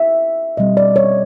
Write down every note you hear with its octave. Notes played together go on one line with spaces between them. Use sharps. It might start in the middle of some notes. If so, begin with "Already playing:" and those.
Already playing: E5
B2 G3 C4 D#5
D5
C#5